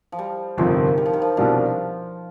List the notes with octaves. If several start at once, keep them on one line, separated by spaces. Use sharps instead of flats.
F3
G3
G1 F2 C3 D#3 F3 C4
G3
F3
D#3
F3
C2 B2 F3 G3 D4